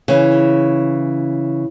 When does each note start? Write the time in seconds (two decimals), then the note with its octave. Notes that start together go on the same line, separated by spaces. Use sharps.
0.08 C#3 E3